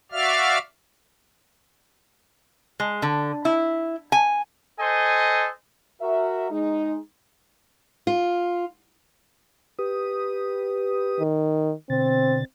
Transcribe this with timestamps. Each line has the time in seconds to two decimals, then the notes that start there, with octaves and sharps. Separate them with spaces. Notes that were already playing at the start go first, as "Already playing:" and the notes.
0.12 F#4 D5 E5 F5 F6
2.80 G#3
3.02 D3
3.45 E4
4.12 G#5
4.79 A4 C5 D#5 G#5
6.02 F#4 A#4 E5
6.51 G#3 D#4
8.07 F4
9.79 G4 B4 D#6
11.19 D#3
11.90 B2 D3 C4 A6